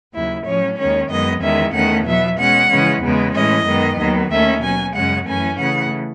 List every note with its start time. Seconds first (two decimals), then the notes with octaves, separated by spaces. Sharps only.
0.13 D#2 C#3 F#3 E4
0.45 A2 F#3 C#4 C#5
0.78 D#2 D#3 G#3 C#4 C#5
1.09 F#2 D#3 G#3 B3 D#5
1.42 E2 D#3 G#3 C#4 E5
1.74 E2 D#3 A3 C#4 F#5
2.06 B2 F#3 B3 E5
2.39 B2 G#3 C#4 F#5
2.70 C#3 E3 G#3 C#4
3.02 E2 C#3 G#3 B3
3.35 A2 E3 G#3 C#4 D#5
3.66 F#2 D#3 G#3 B3
3.99 D#2 D#3 F#3 B3
4.31 D#2 D#3 A3 C#4 E5
4.63 B2 F#3 C#4 G#5
4.95 F#2 C#3 G#3 C#4 F#5
5.27 F#2 E3 A3 C#4 G#5
5.59 C#3 E3 A3 F#5